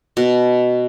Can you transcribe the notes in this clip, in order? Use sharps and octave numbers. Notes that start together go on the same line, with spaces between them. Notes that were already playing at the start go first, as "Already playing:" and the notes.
B2